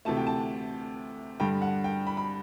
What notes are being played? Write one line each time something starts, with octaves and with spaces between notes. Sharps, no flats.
D2 C3 E3 A3 A5
G5
A5
G2 D3 G3 G5
F#5
G5
B5
B5